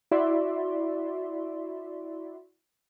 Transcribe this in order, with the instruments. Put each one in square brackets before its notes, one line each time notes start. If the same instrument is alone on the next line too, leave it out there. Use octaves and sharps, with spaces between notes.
[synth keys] E4 F#4 D5 E5 C6